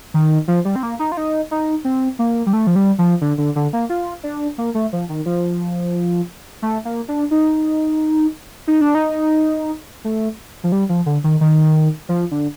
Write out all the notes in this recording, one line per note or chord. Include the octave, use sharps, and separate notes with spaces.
D#3
F3
G3
C4
A#3
D#4
F4
D#4
D#4
C4
A#3
G3
A3
F3
G3
F3
D3
D3
D3
A#3
F4
D4
A#3
A3
F3
D#3
F3
A3
A#3
D4
D#4
D#4
D4
D#4
A3
F3
G3
F3
D3
D#3
D#3
F3
D3